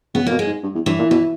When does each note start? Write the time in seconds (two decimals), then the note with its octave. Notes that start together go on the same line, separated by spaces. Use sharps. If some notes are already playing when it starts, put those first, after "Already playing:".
0.14 C#3 B3
0.26 B2 A#3
0.39 G#3
0.47 G#2
0.63 G2
0.75 E2
0.86 G2 E3
0.99 A#2
1.10 B2 E3